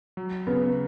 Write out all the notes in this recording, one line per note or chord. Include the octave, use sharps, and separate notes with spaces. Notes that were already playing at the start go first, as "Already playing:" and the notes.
F#3
C#3 B3